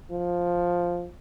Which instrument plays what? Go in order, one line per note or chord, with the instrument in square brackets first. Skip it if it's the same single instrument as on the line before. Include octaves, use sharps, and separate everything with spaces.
[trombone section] F3